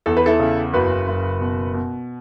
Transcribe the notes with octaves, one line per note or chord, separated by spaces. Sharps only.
E2 A4
B4
E4 A4
C#3
F#1 F#4 B4
F#1
B2
B2